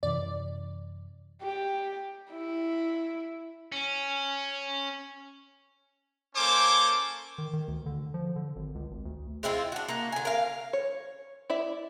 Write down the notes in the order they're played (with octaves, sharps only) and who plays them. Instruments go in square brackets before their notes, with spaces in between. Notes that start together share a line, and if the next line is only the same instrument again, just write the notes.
[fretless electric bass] F#2 C3 E3 [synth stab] D5
[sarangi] G4
E4
[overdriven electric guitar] C#4
[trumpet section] A#3 C#4 A4 C5 G#5 D6
[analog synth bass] D#3
D#3
D2
D3
F3
D3
G#1
C#2
G#1
D2
[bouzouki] G#3 C4 E4 F4
D4 F#4
A#3 F#4
D3 G#5
A#4 F5
[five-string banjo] C#5
E4 D5 E5